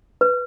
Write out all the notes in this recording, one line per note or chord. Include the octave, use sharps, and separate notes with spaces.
B4